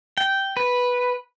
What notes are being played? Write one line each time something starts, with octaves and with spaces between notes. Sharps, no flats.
G5
B4